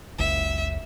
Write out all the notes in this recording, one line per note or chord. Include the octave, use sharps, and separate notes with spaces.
F#1 C#2 E5